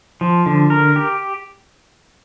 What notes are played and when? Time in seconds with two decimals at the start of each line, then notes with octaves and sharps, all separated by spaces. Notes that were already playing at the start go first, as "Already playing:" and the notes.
0.21 F3
0.46 D3
0.70 A#4
0.96 G4